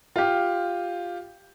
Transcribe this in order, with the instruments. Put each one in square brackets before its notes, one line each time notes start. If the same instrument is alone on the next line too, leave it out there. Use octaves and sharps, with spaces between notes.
[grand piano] F4 G4